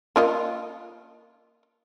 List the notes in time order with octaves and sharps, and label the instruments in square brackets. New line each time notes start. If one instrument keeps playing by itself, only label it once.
[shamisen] A#3 F4 D#5